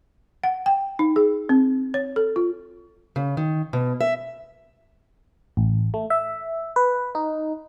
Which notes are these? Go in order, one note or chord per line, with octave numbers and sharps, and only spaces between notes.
F#5
G5
D#4
G#4
C4
C#5
A4
F4
C#3
D#3
B2
E5
A1
A3
E5
B4
D#4